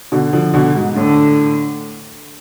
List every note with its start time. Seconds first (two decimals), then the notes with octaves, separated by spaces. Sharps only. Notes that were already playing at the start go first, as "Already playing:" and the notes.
0.12 B2 D3
0.33 D3 F3
0.54 B2 D3
0.75 G#2
0.96 A2 D3